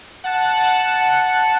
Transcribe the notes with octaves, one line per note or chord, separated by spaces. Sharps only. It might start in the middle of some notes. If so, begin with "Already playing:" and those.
F#5 A5 F#6